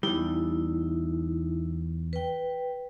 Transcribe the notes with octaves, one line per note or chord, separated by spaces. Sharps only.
E2 G3 D#4 E4
B4 G5